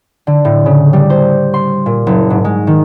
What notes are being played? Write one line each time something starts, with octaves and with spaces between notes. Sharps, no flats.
D3
A2
C#3
G3
C5
C6
A#2
F#1
G#2
G#3
D#3